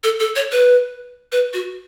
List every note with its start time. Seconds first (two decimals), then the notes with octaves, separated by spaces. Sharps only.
0.03 A4
0.20 A4
0.36 C#5
0.52 B4
1.32 B4
1.53 F#4